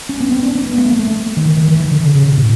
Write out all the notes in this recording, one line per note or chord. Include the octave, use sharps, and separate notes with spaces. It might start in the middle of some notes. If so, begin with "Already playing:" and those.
C#4
B3
C4
D4
B3
B3
A3
A#3
A3
D#3
E3
D#3
E3
D#3
D3
C#3
C#3
B2
A2